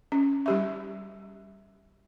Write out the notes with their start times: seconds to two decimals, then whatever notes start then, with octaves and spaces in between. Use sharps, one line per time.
0.12 C#4
0.46 G3 G4 E5